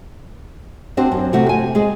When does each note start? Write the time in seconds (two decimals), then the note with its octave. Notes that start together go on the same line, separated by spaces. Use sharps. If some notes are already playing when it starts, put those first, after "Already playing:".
0.97 C4 D4 F#4 C5
1.12 F#2
1.33 C3 A3 F#4
1.49 G#5
1.75 G#3 G#4